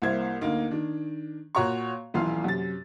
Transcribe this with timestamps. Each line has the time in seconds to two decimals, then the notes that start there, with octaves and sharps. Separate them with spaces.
0.02 C2 A#3 E4 C5 G#6
0.41 D2 A#3 D#4
0.71 D#3 D4
1.55 A#2 F#4 C#5 A#5 C#6
2.14 D#1 B1 E3 F4 F5 C6
2.44 F#2 C3 A6